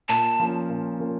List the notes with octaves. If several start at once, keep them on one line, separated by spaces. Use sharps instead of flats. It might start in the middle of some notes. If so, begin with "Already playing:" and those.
A#2 A5
F3 A#3 C#4
A#2
F3 A#3 C#4